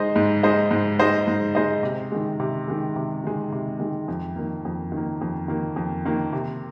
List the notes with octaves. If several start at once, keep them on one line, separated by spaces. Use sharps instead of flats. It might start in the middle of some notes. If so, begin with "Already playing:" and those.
Already playing: G#3 D#4 C5 D#5
G#2
G#3 D#4 C5 D#5
G#2
G#3 D#4 C5 D#5
G#2
G#3 D#4 C5 D#5
C3
D#3 G#3
C3
D#3 G#3
C3
D#3 G#3
C3
D#3 G#3
F2
D#3 A#3
F2
D#3
A#3
F2
D#3 A#3
F2
D#3 A#3
C3